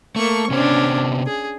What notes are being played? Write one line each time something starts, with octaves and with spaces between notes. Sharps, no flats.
A3 A#3 C#6
C3 B3 C#4 D4 C5
G#4